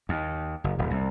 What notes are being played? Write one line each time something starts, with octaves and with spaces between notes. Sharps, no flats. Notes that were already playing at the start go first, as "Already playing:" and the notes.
D#2
F#1
D#1
C2